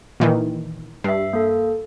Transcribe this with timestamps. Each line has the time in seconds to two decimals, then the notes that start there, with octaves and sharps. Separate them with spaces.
0.20 A#2 D#3 E3
1.04 G2 E5 C7
1.33 A#3 A4